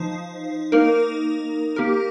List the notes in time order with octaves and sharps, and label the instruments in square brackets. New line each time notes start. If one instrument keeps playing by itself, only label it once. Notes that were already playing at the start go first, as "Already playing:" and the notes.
Already playing: [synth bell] F3 D#4 C5
A#3 D#4 A#4
A#3 G4 A#4